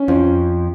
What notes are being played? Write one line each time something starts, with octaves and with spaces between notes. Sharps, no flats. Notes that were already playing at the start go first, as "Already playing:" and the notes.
Already playing: C#4
F2 F3